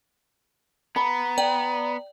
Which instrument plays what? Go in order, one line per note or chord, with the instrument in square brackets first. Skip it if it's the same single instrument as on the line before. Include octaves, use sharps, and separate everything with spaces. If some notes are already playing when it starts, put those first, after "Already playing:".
[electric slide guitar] B3 [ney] A#5 [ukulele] B5
[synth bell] D5 [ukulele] G5